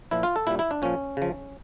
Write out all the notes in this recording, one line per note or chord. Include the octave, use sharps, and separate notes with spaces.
A#2 F3 E4
F4
A4
A#2 G3 E4
E4
D4
A#2 F3 C#4
C#3 F3